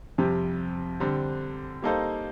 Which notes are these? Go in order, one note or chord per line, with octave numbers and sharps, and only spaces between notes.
F2 C3 G3
D3 G3 C4
G3 A#3 D#4 A4 C5